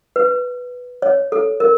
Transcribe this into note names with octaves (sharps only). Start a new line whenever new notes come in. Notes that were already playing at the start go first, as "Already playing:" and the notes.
B4
C#5
A4
A#4